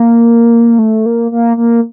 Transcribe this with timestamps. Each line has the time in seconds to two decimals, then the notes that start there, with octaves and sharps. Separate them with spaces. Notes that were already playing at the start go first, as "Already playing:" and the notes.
Already playing: A#3
0.79 A3
1.06 A#3
1.32 A#3
1.57 A#3